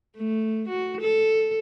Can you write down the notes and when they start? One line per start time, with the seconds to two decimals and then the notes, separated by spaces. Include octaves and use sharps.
0.17 A3
0.68 F#4
1.01 A4